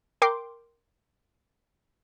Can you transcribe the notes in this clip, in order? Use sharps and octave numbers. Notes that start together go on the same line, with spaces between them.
A#4 G5 C6 D6